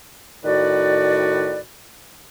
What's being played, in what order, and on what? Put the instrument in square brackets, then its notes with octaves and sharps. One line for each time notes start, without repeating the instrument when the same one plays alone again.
[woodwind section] A2 D#3 F#4 B4 D5